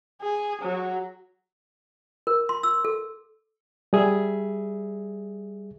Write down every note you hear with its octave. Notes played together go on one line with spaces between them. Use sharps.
G#4
F#3
A#4
C6
E6
A4
G3 G#4 E5